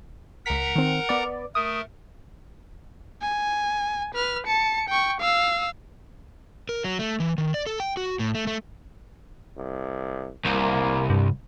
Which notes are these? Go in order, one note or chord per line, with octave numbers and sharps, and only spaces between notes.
C#2 A#4 F#5 A#5 B6
D#3 C4
B3 D5
A3 A#4 D#6
G#5
B4 F6
A5 C#7
G5 C#6
F5 E6
A#4
F#3
A3
E3
D#3
D5
A4
G5
F#4
A2
A3
A3
C2
C2 A#3
G2